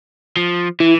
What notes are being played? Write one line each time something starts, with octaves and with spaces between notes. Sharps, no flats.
F3
E3 E4